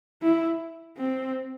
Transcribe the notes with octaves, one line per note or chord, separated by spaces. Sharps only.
E4
C4